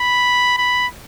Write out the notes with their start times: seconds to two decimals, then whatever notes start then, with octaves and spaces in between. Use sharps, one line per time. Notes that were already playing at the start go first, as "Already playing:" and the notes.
Already playing: B5
0.57 B5